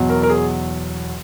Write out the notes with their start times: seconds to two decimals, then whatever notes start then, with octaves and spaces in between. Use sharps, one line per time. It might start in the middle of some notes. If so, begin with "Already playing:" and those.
Already playing: E2 B2 F#3
0.09 A#4
0.23 A#4
0.30 G#4